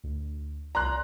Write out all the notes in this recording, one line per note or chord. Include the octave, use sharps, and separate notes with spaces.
D2
C2 A#4 D5 A#5 C6 F#6